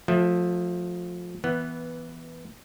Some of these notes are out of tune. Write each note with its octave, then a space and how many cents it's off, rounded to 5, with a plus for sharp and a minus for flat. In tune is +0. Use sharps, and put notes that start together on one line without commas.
F3 +20 A3 -5 E5 +0
E3 +0 B3 -5